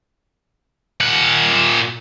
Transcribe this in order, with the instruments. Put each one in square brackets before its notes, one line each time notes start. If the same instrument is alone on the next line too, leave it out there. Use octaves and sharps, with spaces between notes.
[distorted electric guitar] A#2 F#5